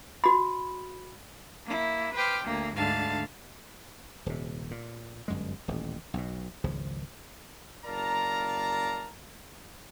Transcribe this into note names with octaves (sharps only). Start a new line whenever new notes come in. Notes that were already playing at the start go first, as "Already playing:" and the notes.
F#4 B5
A#3 E4
B4 C5 G5 D6 F6
D2 A#3
D2 G#2 D3 F5 A5
D#1 C3
A#2
G1 F#2 G#3
D#1 A1
B1 B2
G#1 C#2 C#3 F3
F#1 A#4 D5 F5 A5 A#5